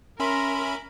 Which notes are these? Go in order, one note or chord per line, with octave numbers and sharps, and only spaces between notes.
C#4 A#4 E5 B5 C6